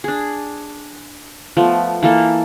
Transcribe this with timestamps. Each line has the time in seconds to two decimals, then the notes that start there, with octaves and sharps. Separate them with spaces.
0.04 D4 G#4
1.57 F3 A3 B3
2.03 E3 A#3 A4